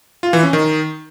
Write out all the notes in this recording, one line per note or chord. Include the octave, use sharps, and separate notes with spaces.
F4
E3
C#4
D#3